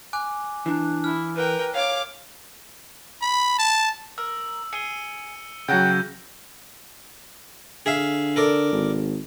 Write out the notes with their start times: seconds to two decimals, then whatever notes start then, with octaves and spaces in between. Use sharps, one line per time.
0.13 G#5 D6 F#6
0.66 E3 D4
1.04 E4 F6
1.36 A#4 B4 G5
1.74 C#5 F5 D6
3.22 B5
3.58 A5
4.18 A#4 E6
4.73 G#4 C#7 D#7 G7
5.68 C#3 F#3 A4 F#5 G5 G6 A#6
7.86 D3 G#4 E5 F5
8.36 A4 A#4 D5
8.73 G#1